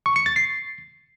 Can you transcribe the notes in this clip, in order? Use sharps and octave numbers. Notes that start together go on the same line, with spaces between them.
C#6
C#7
A6
C7